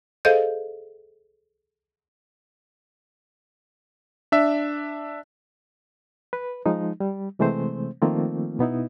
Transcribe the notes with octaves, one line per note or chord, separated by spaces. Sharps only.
G#4 A4 C5 D#5 F5 G6
D4 E5
B4
F3 G#3 D#4
G3
C3 E3 G#3 A3 C4 C5
D#3 F3 A3 A#3 C4 F4
B2 B3 D#4 E4